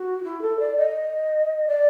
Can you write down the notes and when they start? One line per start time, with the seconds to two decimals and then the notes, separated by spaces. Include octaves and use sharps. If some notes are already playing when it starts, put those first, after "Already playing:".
Already playing: F#4
0.23 E4
0.41 A4
0.59 D5
0.77 D#5
1.67 D5